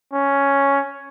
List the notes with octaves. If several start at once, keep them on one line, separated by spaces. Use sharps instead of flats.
C#4